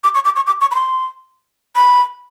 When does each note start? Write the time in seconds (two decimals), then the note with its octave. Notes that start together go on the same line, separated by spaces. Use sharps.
0.04 D6
0.15 C#6
0.25 D6
0.36 C#6
0.47 D6
0.61 C#6
0.71 B5
0.75 C6
1.76 B5